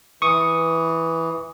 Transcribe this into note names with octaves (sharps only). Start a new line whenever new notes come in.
E3 C#6 D#6